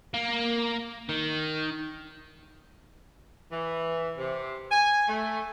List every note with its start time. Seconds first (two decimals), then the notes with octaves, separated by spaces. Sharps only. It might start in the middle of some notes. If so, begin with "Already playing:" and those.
0.14 A#3
1.09 D#3
3.51 E3
4.18 C3
4.70 G#5
5.07 A3